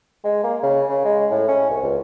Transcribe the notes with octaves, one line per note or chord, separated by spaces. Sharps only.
G#3
A#3
C#3
C#3
G#3
A2
C#4
C2
C#2